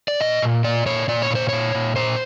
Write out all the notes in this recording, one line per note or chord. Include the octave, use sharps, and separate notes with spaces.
D5
A#2 D#5
A#2
A#2 D5
A#2 C#5
A#2 D5
C#5
A#2 C5
A#2 C#5
A#2
A#2 C5